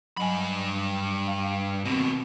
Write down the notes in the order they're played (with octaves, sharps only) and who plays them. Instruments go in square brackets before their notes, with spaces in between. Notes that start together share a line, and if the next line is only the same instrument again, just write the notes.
[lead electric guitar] G2 B5 [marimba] F#3 D#5 G#5
[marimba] F5
[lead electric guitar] D#2 B2 [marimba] C4 A#6